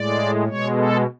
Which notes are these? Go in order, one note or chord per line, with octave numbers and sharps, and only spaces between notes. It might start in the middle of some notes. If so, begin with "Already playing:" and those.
Already playing: A2 G#3 D5
B2 G#3 C#5
A4